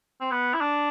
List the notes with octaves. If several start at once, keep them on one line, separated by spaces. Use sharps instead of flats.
C4
B3
E4
D4